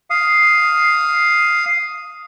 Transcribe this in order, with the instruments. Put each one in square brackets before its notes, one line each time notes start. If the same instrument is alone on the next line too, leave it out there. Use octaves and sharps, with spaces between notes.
[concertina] F5 D#6